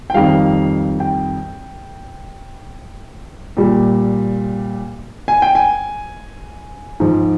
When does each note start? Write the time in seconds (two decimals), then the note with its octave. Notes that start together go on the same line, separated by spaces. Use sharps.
0.10 G5
0.14 F2 D#3 G3 F5
1.00 G5
3.57 A#2 G3
5.28 G#5
5.42 G5
5.55 G#5
7.00 G#2 F3